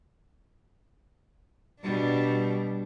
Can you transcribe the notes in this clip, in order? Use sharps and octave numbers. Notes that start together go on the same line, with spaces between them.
B2 G3 D4